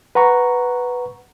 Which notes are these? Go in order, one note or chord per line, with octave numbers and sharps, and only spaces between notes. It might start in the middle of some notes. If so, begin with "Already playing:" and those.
B4 F#5 A#5 C#6